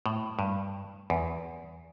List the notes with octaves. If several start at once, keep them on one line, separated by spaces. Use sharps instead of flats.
A2
G2
E2